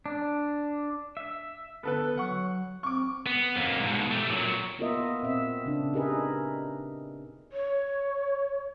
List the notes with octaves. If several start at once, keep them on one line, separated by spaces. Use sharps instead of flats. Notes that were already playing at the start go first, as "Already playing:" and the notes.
D4
E5
D3 B3 A4 B4
F#3 F#5 C#6
C4 C#6 D6
B3
F2 A#3
G#2 B2
A3 G4
A#2 F#3
A#3 B3 F4 A#4 D#5 E5
A#2 C4 E5
C#3 D4
D#4 G4 G#4 A#4 B4 E5
C#5